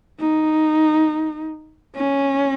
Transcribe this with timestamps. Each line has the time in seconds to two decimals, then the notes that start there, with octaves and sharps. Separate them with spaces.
0.20 D#4
1.95 C#4